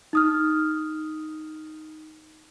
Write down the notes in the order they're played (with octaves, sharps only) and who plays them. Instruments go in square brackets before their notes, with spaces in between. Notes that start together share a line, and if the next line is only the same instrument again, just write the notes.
[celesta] D#4 D#6 F6